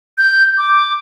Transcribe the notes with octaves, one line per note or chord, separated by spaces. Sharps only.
G6
D6